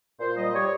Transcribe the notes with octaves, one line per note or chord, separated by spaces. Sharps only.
A#2 C5
G3 D#5
G3 C#5